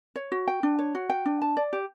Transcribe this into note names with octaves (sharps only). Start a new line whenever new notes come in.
C#5
F#4
G5
D4
C#5
F#4
G5
D4
A5
D5
G4